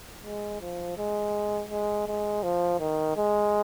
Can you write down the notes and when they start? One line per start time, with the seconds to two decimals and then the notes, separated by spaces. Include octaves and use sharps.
0.23 G#3
0.61 F3
0.98 G#3
1.71 G#3
2.07 G#3
2.43 F3
2.80 D#3
3.17 G#3